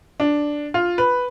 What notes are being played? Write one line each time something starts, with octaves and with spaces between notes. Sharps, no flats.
D4
F4
B4